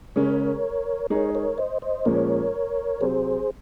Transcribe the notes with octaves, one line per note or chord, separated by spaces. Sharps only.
C#3 G#3 C#4 A#4 C#5
G#3 D#4 G#4 A#4 C#5
A#4 C#5
C5 D#5
C5 D#5
A#2 F3 G#3 C#4 A#4 C#5
C3 F#3 C4 G#4 C5